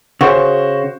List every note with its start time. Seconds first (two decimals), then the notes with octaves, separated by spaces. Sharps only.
0.21 C#3 F#4 C5